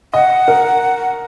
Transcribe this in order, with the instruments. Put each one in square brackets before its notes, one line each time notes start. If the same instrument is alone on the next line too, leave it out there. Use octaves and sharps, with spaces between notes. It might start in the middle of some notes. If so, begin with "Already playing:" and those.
[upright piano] D#5 [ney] F#5
[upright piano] A#4